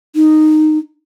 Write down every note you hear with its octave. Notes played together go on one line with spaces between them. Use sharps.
D#4